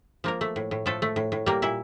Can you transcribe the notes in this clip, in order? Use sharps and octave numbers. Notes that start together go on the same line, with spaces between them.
F3 A#3 A#4
A3
A2
A2
F3 A3 A4
A3
A2
A2
G3 A#3 A#4
A#2 E4 E5